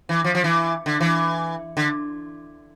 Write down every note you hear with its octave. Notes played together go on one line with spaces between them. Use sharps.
E3
F3
F3
E3
D3
E3
D3